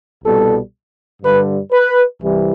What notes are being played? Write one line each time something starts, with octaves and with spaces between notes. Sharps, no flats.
C2 B2 G3 A4
G2 D3 G3 B4
B4
C2 C3 E3 G3